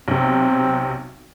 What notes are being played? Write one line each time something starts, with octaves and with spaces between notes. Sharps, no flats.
B1 C3 C4